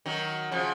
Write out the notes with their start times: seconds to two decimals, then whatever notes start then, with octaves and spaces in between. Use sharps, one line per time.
0.06 D#3 F#3
0.52 C#3 F3